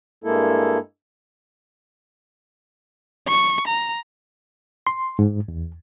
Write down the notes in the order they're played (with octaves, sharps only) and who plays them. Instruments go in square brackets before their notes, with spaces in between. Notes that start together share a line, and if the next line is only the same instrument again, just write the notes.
[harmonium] G2 G#3 A#3 E4 A4
[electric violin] C#6
A#5
[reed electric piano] C6
G#2
E2